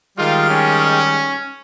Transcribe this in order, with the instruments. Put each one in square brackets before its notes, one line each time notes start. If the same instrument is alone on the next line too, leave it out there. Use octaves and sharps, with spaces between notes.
[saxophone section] D#3 G3 G#3 [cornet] F4
[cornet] C#4